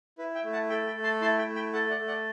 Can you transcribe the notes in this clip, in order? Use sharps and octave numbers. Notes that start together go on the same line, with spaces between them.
E4 B4
E5 G5
A3
F#5 A5
A4 G5 B5
G5 B5
A3
A5 C6
E4 A5 C6
G5 B5
A3
G5 B5
A4 F#5 A5
D5 F#5
A3
D5 F#5